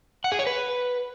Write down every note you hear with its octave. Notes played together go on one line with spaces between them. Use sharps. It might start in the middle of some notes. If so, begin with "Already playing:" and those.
F#5
G#4
C#5
B4